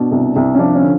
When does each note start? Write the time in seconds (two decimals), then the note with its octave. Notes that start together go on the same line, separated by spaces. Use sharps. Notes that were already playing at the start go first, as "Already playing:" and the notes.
Already playing: B2 D4
0.12 C2
0.36 C2
0.55 C#4
0.59 F3 D4
0.75 C#4
0.82 D3